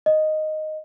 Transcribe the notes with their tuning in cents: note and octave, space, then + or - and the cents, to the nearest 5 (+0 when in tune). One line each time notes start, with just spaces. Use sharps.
D#5 -5